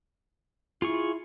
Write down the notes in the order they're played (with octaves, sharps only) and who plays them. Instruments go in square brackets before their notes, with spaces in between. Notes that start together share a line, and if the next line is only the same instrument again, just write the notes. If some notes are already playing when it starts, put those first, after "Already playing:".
[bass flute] E4 [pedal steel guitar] F4 G#4 C#6